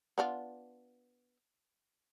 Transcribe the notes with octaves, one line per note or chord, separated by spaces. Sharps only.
B3 D4 F4